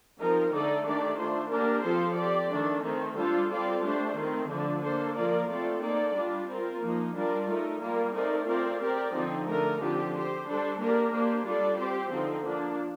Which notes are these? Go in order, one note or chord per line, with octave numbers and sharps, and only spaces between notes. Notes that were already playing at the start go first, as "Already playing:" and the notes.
F3 C4 D#4 A#4
D3 A3 D#4 A4 D5
D#3 A3 D4 G4 D5
A3 D4 F4 C5
A#3 D4 G4 A#4
F3 C4 F4 A4 C5
C4 G4 D5
D#3 A3 D4 A4
D#3 A3 C4
G3 D4 F4 A4 C5
G3 C4 F4 A4 D5
A3 D4 G4 C5
D#3 A3 C4
D3 F3 A3 D4
A#3 D4 A4 C5
F3 A#3 F4 A#4 D5
A3 C4 F4 A4 D5
A#3 D#4 A4 D5
G3 D4 F4
C4 F4 A#4
F3 A#3 D#4
G3 D4 F4 A#4 D5
A3 D#4 A#4
G3 A#3 F4 A#4
A3 C4 D#4 A#4 D5
C4 F4 A#4 D5
C4 G4 A#4 D5
D3 F3 C4 D#4
D3 A3 D#4 A#4
D3 F3 C4 G4
C4 G4 C5
G3 D4 A4 C5
A#3 D4 G4 A#4 D5
A#3 D4 G4 C5
G3 D4 F4 A4 D5
C4 G4 C5
D3 F3 C4 D#4
F3 A#3 D4